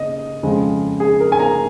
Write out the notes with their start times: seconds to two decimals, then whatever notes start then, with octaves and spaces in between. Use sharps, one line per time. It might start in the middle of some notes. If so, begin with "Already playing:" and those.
Already playing: C#3 A#3 D#5
0.43 F2 C#3 G#3
1.00 G#4
1.20 A#4
1.32 G#5
1.39 A#5